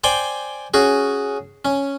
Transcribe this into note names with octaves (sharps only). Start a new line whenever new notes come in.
C5 D5 G5 G#5
C#4 F#4 G#4
C#4